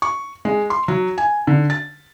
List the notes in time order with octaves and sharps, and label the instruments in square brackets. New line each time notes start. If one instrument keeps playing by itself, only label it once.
[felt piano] C#6
G#3
C6
F#3
G#5
D3
A6